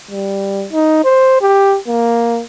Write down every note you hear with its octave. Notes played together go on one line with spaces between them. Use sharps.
G3
D#4
C5
G4
A#3